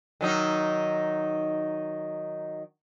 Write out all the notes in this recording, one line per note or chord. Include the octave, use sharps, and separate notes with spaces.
D#3 F#3 D#4